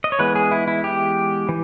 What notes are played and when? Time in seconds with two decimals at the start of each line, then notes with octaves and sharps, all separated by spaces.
0.04 D#5
0.12 C#5
0.19 E3 G#3 B3 B4
0.36 G#4
0.51 E4
0.68 E4
0.84 G4
1.49 E3